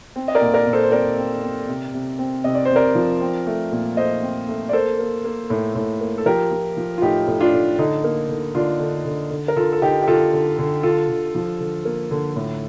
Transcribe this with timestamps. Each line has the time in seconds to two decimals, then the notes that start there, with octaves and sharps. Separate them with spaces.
0.16 C4
0.28 D#5
0.35 A#4 D5
0.41 A#2
0.54 A#4 D5
0.67 A#2
0.73 A4 C5
0.83 C5
0.92 C4 A#4 D5
1.18 C4
1.43 C4
1.68 C3
1.94 C3
2.19 C4
2.44 C3 D#5
2.55 D5
2.65 C3 C5
2.76 A#4 D5
2.95 F3
3.21 C4
3.47 A3
3.72 A#2
3.97 A3 C5 D#5
4.22 C4
4.48 A3
4.69 D5
4.73 A#3 A4 C5
4.99 A#3
5.24 A#3
5.50 A2
5.75 A2
6.01 A#3
6.18 A4
6.26 F3 G4 A#4
6.52 F3
6.77 F3
6.98 F4
7.02 A2 D#4 G4
7.27 A2
7.40 D4 F4
7.54 A2
7.78 D3 D#4
8.04 A#3
8.29 D3
8.55 D3 D4 F4
8.80 D3
9.05 D3
9.31 D3
9.48 A#4
9.56 D3 F4 A4
9.73 A4
9.82 D3 D#4 G4
10.03 G4
10.07 D3 F4 A4
10.33 D3
10.58 D3
10.83 D3 F4 A4
11.09 D3
11.35 F3
11.60 D3
11.85 A#3
12.11 D3
12.36 A2